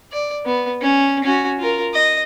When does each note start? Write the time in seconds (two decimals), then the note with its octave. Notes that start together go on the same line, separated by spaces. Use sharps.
0.12 D5
0.45 B3
0.81 C#4
1.24 C#4 F#4
1.59 F4 A#4
1.93 D#5